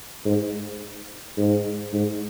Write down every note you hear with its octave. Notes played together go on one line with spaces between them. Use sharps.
G#2
G#2
G#2